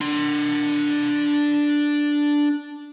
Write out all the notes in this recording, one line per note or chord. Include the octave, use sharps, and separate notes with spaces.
D4 C6